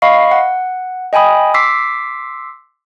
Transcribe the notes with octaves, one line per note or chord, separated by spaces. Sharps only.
D#5 F5 B5 C#6 C7
F#5
D#5 G5 G#5 B5 D#6
C6 D6 E6 B6 C7